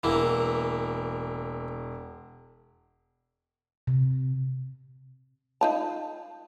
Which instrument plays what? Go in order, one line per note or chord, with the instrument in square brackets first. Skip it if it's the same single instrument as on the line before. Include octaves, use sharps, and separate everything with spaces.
[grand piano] E1 [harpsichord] E3 A#3 E4
[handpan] C3
[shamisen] D#4 F4 A5